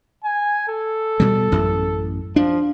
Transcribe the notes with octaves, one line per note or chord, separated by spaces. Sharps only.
G#5
A4
B2 G3
A1 F#2
F3 D4